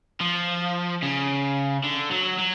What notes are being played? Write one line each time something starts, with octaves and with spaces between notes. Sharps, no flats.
F3
C#3
D3
F#3
F#3